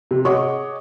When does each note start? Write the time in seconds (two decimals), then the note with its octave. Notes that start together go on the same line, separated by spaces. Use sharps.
0.11 C3
0.25 G#4 C#5 D#5 F#5 C#6 D6